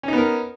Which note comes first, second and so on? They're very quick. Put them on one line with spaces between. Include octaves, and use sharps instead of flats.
C#4 D#4 B3 A#4